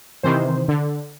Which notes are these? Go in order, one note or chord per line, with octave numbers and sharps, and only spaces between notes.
C3 D#3 E3 C5
D3